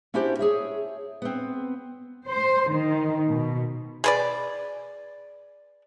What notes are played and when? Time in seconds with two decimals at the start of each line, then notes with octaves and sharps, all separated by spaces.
0.14 C#4 D4 E4 F#4 G4 C5
0.39 G#4 C#5 E5
1.22 B3 C4
2.26 C5
2.73 D#3
3.29 B2
4.04 G#4 B4 D5